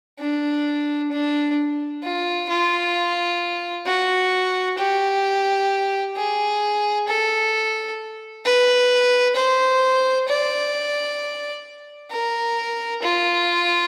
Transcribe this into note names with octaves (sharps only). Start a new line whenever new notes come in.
D4
D4
F4
F4
F#4
G4
G#4
A4
B4
C5
D5
A#4
F4